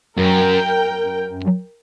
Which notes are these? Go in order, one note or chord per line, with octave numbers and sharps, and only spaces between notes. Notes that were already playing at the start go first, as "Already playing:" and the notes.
F#2 A#4 G5